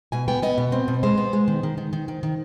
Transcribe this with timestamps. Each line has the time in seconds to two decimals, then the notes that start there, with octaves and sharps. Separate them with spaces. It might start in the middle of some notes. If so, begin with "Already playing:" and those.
0.12 B2 G#5
0.28 B3 G5
0.42 B3 D#5
0.58 B2
0.72 C4
0.88 B2
1.03 G#3 C5
1.18 B3
1.33 G#3
1.48 D#3
1.63 D#3
1.77 D#3
1.93 D#3
2.08 D#3
2.23 D#3